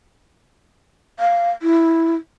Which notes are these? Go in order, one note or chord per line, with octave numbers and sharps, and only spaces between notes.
F5
E4